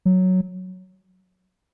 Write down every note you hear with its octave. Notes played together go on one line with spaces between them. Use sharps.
F#3